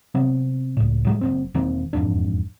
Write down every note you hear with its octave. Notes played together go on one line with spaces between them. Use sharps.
C3 F#3 B3 C4
C#2 A2
A2 F#3 G#3
F#1 F#2 C4
E1 D#3 A#3 C4
E1 F2 G#2 D4